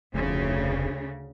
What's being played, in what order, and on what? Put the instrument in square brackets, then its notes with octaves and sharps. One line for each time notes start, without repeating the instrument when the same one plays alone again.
[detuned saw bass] F1 [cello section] D2 C#3